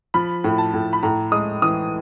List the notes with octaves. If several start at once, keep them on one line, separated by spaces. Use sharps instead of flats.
F3 B5
A2
A5
A2
B5
A2 A#5
G#3 D#6
E3 D#6